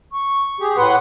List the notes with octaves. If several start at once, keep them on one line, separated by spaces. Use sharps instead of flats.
C#6
G4 G#4
A2 B4 F#5 C6